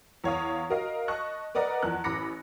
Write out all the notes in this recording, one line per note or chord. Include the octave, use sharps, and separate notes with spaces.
E2 C#5 F5 D#6
F#4 A#4 D#5 F5
D#5 A5 C#6 F#6
A#4 B4 D5 D#5 F#5 A#5
E2 F3 F#6
A1 B5 D6 A#6 C#7